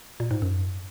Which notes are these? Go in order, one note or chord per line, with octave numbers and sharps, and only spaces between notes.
A#2
G#2
F#2